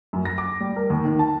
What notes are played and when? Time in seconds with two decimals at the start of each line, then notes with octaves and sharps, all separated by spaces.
0.13 F#2
0.25 A#6
0.38 D6
0.60 G3
0.76 A#4
0.90 D#2
1.05 D#3
1.19 A5